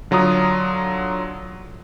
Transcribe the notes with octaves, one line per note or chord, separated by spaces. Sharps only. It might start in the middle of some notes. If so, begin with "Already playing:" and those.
D3 F#3 F4 A#5 D#6